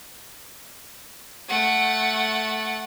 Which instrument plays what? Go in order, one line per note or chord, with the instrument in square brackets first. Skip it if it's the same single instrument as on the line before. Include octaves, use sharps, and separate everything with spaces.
[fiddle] A3 F#5